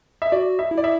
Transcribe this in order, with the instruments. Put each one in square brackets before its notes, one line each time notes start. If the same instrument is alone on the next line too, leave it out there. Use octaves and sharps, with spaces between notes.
[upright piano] E5
[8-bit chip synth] F#4 [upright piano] D5
[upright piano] E5
[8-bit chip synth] E4
[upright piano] D5
E5